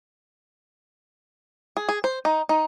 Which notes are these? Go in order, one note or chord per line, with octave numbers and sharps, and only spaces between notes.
G#4
G#4
C5
D#4
D#4